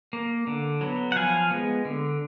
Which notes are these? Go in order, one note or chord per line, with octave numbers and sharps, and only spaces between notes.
A#3
D3
F#3 B3
F#5
F3 F5 G#5
G#3 B3
D3